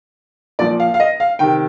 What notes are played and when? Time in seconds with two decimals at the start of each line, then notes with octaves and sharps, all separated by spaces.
0.59 A#2 F3 D5
0.80 F5
0.94 F5
1.00 D#5
1.20 F5
1.39 C3 D#3 G5